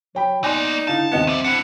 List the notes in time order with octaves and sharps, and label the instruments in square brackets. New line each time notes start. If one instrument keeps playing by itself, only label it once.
[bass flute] F#3 [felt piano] C#5 G5 B5
[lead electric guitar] A#3 B3 [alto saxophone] D#4 [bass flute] D5 [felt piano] G#5 C6
[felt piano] D3 F5 [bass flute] E4 [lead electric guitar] A5
[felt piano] D#2 D#5 C#7 [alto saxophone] B3 [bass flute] C4
[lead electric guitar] C2 G3 [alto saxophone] E5 [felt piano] D#7
[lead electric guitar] D4 E4 [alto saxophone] F#5